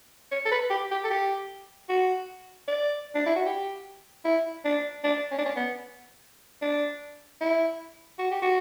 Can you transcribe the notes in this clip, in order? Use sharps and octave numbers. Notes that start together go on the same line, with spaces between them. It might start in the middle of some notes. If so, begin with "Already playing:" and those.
C#5
A4
B4
G4
G4
A4
G4
F#4
D5
D4
E4
F#4
G4
E4
D4
D4
C#4
D4
C#4
B3
D4
E4
F#4
G4
F#4